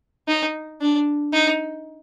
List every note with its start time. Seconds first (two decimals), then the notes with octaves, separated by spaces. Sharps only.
0.28 D#4
0.81 D4
1.33 D#4